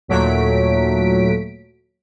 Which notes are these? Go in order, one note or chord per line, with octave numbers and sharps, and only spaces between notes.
D#2 A#2 F#3 A3 B6 D7